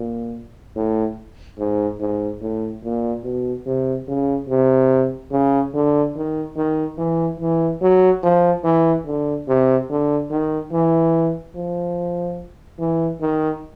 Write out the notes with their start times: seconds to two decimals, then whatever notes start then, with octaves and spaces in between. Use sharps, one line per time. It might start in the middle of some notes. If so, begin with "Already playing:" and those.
Already playing: A#2
0.75 A2
1.59 G#2
2.00 G#2
2.42 A2
2.84 A#2
3.24 B2
3.66 C3
4.08 C#3
4.49 C3
5.32 C#3
5.74 D3
6.16 D#3
6.56 D#3
6.98 E3
7.40 E3
7.82 F#3
8.23 F3
8.64 E3
9.06 D3
9.48 C3
9.90 D3
10.30 D#3
10.72 E3
11.55 F3
12.79 E3
13.21 D#3